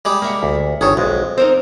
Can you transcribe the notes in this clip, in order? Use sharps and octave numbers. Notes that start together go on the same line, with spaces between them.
G3 G#3 G4
A#3 A#4 E5 F#5
D2
G1 D#3 G#4 A4 C#5
B1 F2 G#3
C4 D#4 A#4 C5